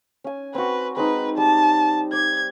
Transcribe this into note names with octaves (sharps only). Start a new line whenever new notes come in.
C#4 G#5
C4 F#4 B4
G#3 C4 D#4 B4
G3 A5
D5 G#6